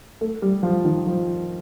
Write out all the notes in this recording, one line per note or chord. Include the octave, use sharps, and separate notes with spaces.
A3
G3
F3
D#3
F3